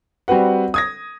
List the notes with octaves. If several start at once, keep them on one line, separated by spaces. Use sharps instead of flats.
G3 C4 F#4 B4 F#5
D#6 G#6 A#6